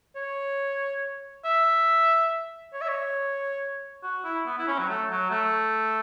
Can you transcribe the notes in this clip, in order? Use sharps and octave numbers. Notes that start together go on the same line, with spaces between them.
C#5
E5
C#5
E5
C#5
F#4
E4
B3
E4
C#4
F#3
A3
F#3
A3